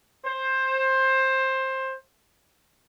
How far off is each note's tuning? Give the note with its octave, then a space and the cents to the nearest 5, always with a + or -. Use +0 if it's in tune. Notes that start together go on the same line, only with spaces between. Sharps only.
C5 +15